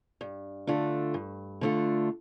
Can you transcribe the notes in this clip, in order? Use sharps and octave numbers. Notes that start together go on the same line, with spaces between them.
G2
D3 A3 D4 F4
G2
D3 A3 D4 F4